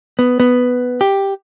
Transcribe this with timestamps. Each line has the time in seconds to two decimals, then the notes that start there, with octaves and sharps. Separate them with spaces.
0.19 B3
0.40 B3
1.01 G4